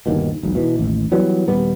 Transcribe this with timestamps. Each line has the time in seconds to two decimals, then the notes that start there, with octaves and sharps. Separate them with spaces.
0.06 G1 D#2 B2
0.43 E1 B1
0.55 B2 E3
0.76 A1 D#2
1.11 E3 F#3 G3 B3
1.48 D#1 G3 B3